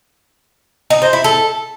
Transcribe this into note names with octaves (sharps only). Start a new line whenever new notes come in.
D#4
C5
E4
A4